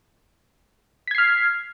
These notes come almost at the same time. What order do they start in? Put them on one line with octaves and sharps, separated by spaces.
B6 G#6 C7 F6